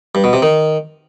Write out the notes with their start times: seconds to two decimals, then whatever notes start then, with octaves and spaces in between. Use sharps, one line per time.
0.15 G2
0.24 B2
0.33 C3
0.42 D#3